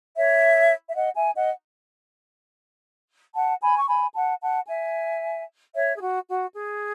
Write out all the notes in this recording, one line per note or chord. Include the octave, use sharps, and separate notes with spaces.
C#5 E5
E5
D#5 F#5
E5 G#5
D#5 F#5
F#5 A5
G#5 B5
C#6
G#5 B5
F#5 A5
F#5 A5
E5 G#5
C#5 E5
G#4
F#4
F#4
G#4